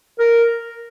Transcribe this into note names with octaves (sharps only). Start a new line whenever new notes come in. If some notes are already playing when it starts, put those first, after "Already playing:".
A#4